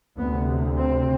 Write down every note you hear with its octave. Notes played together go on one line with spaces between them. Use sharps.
D2 C3 B3
C4